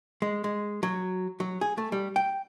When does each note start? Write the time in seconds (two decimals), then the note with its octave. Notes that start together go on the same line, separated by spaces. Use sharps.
0.22 G#3
0.44 G#3
0.83 F#3
1.40 F#3
1.61 G#4
1.78 A3
1.92 G3
2.16 G5